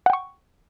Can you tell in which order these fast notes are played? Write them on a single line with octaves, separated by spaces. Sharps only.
F#5 G5 C#6